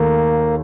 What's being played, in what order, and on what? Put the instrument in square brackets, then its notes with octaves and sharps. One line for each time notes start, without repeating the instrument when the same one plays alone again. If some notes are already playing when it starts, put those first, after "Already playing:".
Already playing: [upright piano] D#2 D#3 A3 [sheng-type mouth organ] A#3